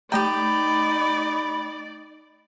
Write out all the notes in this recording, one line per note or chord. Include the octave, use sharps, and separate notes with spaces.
A3 D#4 G4 D5 G5 A#5 B5